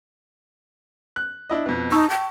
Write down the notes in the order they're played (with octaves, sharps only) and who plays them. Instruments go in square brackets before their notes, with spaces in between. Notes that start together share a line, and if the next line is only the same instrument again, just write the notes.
[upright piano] F#6
D4 E4 D#5
F2 B2
[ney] D#4 [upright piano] A5 C#6 E6
[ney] G5